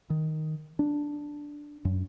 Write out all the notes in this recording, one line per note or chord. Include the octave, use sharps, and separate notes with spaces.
D#3
D4
F#2